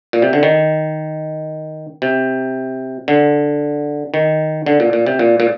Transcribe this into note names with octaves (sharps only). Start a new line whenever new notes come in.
A#2
C3
D3
D#3
C3
D3
D#3
D3
A#2
A#2
C3
A#2
A#2